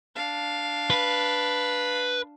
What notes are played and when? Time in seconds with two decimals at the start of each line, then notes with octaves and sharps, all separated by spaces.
0.15 D4 F5
0.90 B4